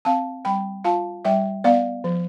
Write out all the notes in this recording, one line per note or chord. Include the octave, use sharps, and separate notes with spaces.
C4 F5 A5
G3 G5 B5
F4 F5 A5
G3 E5 G5
B3 D5 F5
F3